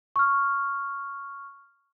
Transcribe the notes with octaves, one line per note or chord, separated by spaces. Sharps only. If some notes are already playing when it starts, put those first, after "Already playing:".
C#6 F6